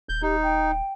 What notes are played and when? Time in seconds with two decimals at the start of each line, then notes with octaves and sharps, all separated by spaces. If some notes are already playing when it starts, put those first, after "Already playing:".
0.09 D#1 G6
0.22 D#4 G4
0.43 G5